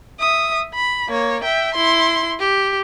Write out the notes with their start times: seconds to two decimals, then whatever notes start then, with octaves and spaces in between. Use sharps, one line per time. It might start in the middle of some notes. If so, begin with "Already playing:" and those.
0.19 E5 D#6
0.75 B5
1.09 A#3 C#5
1.44 E5 G5
1.74 E4 C6
2.39 G4